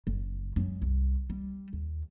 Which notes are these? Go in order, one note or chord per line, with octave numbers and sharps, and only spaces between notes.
F#1
F#2 G#3
C2
G3
D#2